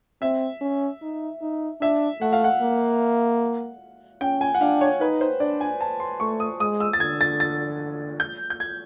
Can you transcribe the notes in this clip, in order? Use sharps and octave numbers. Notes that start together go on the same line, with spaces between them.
C4 E5
C#4
D#4
D#4
D4 E5
A3 F#5
F5
F#5
A#3
C#4 G5
G#5
F#5
D4 F5
C#5
D#4 B4
C5
D4 D5
G#5
A5
C6
A3 C#6
D#6
G#3 D#6
E6
A6
D3 G#6
A6
A6
G6
G6
G#6